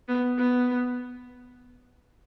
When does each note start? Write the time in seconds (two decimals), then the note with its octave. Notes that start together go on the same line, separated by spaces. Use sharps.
0.08 B3
0.38 B3